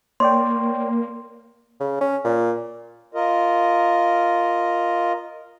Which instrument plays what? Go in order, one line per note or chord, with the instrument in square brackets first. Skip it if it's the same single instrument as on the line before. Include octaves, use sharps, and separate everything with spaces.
[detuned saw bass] A#3 [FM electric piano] C#5 D5 G5 [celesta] C6
[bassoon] C#3
C#4
A#2
[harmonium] F4 A#4 D#5